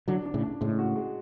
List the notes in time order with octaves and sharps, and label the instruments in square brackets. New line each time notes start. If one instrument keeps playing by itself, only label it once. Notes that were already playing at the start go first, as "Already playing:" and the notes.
[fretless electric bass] D3 F#3 [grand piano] D4
[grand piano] D4
[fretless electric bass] A2 C#3
[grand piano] D4
[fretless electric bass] A2 C#3 [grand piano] G#3
[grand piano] F#4
G#3